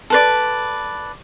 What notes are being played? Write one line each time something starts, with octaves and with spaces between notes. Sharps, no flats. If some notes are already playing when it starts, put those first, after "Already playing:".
A4 B4 D5